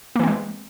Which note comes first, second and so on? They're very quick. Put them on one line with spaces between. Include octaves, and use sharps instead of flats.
A#3 E3 C4 G#3